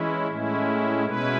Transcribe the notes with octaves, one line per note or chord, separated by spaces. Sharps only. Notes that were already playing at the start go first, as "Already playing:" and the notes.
Already playing: E3 G#3 C#4 E4
A2 G#3 C#4 E4
B2 G#3 C#4 E4 B4